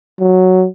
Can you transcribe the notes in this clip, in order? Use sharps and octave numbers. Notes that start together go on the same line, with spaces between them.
F#3